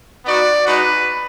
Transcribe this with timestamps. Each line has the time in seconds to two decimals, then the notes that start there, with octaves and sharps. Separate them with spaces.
0.25 B3 D#4 F#4 D5
0.66 G#3 D#4 F#4 B4